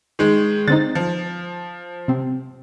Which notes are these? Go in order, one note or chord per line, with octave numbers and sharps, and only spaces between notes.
D#3 G#3
D3 C4 D#4 A6
F3
C3 C4